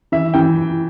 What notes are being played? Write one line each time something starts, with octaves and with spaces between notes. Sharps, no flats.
E3 E5
E3 G5